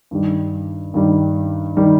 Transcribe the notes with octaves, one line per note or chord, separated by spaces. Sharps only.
G2 D#3 G3
G2 D#3 G3
D#3 G3